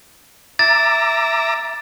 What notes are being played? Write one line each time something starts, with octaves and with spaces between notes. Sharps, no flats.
E5 A#5 D6 A6